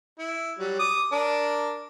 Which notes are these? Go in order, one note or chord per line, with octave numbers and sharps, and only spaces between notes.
E4
F#3 G3
D6 D#6
D4 A#4